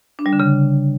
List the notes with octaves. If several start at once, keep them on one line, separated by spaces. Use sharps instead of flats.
D4
G3
D3
C#3